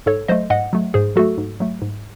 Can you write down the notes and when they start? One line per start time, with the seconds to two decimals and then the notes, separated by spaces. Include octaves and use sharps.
0.06 G#2 A4 C#5
0.28 F#3 A3 C5 D#5
0.50 G#2 D#5 F#5
0.73 F#3 A3
0.94 G#2 G#4 C5
1.16 F#3 A3 F#4 A4
1.38 G#2
1.60 F#3 A3
1.82 G#2